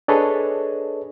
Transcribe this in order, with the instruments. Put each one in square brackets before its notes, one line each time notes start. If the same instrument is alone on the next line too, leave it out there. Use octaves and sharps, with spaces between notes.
[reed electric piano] D4 G#4 A4 B4 C#5 D#5